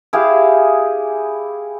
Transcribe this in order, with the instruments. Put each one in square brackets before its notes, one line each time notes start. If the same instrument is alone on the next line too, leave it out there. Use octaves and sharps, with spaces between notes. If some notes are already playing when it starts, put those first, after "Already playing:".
[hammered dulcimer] E4 G4 G#4 F5